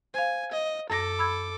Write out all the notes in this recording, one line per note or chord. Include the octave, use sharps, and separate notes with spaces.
C5 F5 G#5
D#5
F#2 A4 D6 A#6
B5 E6 G#6